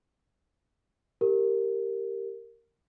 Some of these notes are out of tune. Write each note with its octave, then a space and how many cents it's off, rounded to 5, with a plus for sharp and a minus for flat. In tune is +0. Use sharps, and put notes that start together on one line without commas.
G4 +0 A#4 -10